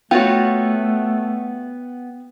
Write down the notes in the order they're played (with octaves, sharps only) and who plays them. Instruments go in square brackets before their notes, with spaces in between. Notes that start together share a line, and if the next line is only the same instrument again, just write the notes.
[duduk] A3 [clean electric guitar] B3 [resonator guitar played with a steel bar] F4 F#4 C#5 [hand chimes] G5